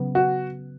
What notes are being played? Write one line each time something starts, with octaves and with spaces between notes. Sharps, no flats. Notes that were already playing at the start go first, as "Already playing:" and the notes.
Already playing: C#3 F#3 B3
F#4